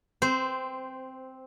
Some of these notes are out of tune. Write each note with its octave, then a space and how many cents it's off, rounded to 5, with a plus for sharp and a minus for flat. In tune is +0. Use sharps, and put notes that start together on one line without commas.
C4 +0 C5 -15